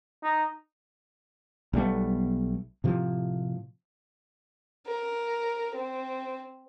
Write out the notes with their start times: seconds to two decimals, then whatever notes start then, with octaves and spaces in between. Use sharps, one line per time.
0.23 D#4
1.73 B1 G3 A3 B3
2.84 A2 C3 F3
4.87 A#4
5.75 C4